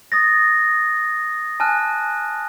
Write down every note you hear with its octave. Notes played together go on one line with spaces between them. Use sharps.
D#6 A6 A#6
G#5 A5 F6 F#6